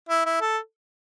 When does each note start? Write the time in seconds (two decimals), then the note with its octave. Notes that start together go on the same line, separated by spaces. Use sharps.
0.09 E4
0.25 E4
0.41 A4